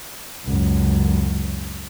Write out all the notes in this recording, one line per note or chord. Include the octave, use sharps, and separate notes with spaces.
C#2 F#2